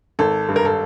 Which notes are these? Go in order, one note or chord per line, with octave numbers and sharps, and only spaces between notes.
G#1 A4
G2
A#4
A4